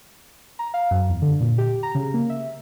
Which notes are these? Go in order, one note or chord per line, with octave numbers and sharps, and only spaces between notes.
A#5
F5
F#2
E2
D3
A#2
G4
A#5
C#3
A#3
E5